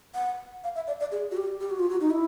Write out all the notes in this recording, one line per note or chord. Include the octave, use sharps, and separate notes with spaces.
F#5
F5
E5
D5
D5
G#4
F#4
G4
G4
F#4
F4
F#4
D#4
E4